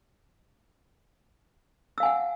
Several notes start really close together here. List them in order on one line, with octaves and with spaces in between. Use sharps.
E6 F5 G#5 F#5